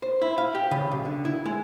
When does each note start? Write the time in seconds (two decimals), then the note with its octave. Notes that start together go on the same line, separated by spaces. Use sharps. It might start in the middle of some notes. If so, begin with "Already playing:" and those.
0.02 C5
0.22 E4
0.38 F5
0.55 G4
0.71 C#3
0.92 B1
1.05 D3
1.25 E4
1.46 G#3